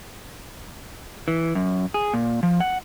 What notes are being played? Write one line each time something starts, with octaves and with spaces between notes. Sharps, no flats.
E3
F#2
G#4
A#2
F3
F#5